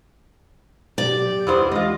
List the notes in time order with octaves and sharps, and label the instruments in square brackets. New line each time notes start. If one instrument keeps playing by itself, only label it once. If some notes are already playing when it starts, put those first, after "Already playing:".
[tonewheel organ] B2 F#3 [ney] G4 [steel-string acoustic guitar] D5
[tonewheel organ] E2 F#5 D#6 [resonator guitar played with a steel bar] G2 E4 C5
[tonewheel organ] E3 G#3 [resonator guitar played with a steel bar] F4 D#5